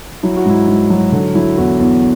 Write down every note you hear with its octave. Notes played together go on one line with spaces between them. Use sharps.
F#3 E4
F#4
G#2 E4
G#2
F#3
D3
F#3 E4
E2 F#4
E2